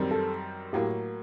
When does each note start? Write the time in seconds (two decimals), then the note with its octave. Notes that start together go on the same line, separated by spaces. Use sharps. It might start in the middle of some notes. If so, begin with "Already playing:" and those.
Already playing: F#2 D#3 G3 C4
0.11 A4
0.73 A2 F#3 A#3 G4